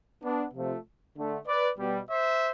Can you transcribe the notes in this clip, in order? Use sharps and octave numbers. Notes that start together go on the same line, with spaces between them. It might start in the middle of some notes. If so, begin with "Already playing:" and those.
B3 D4
C3 F3 A3
D3 A3
B4 D5
B2 G3
C5 E5